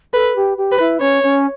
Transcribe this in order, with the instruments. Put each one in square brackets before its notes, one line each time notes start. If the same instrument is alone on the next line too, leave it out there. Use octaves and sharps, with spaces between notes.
[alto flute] A4 [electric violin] B4
[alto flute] G4
G4
[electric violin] B4
[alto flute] E4
[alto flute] C#4 [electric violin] C#5
[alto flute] C#4